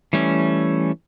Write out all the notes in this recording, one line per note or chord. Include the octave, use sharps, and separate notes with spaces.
E3 G3 A3 C#4